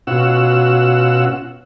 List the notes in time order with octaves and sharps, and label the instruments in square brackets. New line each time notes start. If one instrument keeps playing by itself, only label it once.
[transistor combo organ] B2 C#4 F4 F#4 F#5 E6